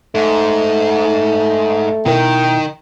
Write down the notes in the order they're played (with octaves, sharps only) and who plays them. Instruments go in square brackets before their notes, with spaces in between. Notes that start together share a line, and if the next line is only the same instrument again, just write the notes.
[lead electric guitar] G#2 [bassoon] A3
[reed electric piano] B2 E4 A#4 [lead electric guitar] D#3 [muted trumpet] G5